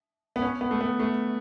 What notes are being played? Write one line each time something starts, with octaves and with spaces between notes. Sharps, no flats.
B3
C#4
B3
A3
B3
A3